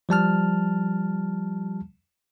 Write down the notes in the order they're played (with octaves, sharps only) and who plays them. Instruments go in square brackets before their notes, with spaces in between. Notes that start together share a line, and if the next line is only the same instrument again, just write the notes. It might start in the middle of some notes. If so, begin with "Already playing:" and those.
[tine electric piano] F3 G3 A5 F6